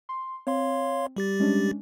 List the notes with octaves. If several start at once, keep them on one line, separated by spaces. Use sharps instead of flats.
C6
C4 C#5 F5 C6
G3 G4 A6
G#3 C#4 D4